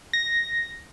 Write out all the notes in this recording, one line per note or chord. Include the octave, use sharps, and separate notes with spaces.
A#6